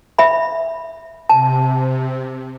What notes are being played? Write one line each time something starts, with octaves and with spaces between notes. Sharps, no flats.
E5 B5
C3 A5